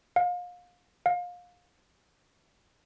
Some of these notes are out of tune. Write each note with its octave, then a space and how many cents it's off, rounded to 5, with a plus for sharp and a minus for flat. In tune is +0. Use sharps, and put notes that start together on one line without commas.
F5 +35
F5 +30